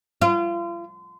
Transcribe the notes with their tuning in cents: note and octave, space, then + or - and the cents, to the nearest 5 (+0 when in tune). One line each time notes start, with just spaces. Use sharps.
F4 -35